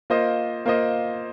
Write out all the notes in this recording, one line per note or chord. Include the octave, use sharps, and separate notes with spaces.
A#3 F4 C5 D#5
A#3 F4 C5 D#5